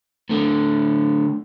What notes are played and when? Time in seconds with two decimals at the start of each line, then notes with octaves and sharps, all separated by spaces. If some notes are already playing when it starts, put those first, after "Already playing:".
0.29 A2 D3